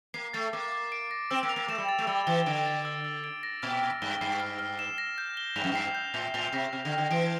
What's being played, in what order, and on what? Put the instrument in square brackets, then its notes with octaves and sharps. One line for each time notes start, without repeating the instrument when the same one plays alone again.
[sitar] A#3 [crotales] C7
[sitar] A3 [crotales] A6
[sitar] A#3 [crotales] D6
[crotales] D6
D7
A#6
[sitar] C4 [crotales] E6
[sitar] A#3
[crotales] F7
[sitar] A#3
[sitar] A3 [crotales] E7
[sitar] G3
[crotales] A6
[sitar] A3
[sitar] G3 [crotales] E6
[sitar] E3 [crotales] G7
[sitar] D3 [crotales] D7
[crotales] A6
E6
E6
D7
A#6
[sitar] A#2 [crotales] F6
[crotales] F6
[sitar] G2 [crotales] G7
[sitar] G2 [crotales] C7
[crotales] F6
F6
E7
A#6
G6
G7
[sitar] G2 [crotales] F7
[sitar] F2
[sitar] G2 [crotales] C7
[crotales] G6
[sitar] A2 [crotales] G6
[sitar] A2 [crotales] F7
[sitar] C3 [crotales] A#6
[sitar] C3 [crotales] F6
[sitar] D3
[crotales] F6
[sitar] D3
[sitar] E3 [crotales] D7